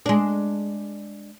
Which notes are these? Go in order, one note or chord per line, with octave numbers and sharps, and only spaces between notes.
G#3 D4